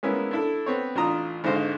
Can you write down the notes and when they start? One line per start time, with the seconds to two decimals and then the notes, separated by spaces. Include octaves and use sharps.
0.03 G#3 A#3 B3 C#4 E4
0.31 D4 E4 A4
0.66 B3 C4 C#5
0.95 A1 D4 F4 A#5 D#6
1.44 G#1 G#2 D3 C5 D#5 F5